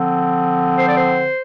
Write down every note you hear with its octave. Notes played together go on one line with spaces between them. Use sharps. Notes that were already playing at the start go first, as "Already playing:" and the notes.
Already playing: D3 F3 C4
C5
D5
C5